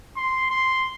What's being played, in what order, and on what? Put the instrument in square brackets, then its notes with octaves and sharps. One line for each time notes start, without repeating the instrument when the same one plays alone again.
[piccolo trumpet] C6
C6